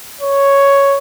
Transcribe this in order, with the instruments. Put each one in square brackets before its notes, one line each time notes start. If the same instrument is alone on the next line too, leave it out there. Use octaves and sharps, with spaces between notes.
[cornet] C#5